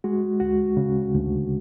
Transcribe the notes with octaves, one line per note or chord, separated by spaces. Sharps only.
G#3 F#4
D2 F#4
C#3
D2